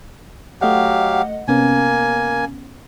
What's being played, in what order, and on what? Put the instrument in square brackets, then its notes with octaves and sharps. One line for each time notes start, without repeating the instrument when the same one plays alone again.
[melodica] F#3 G4 F5 [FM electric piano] A3 D#5 F#5
[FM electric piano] C3 B3 C#4 [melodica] A#3 G#5